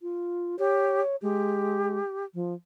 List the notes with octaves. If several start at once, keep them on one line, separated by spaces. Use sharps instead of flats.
F4
G4 C#5
G#3 G4
F3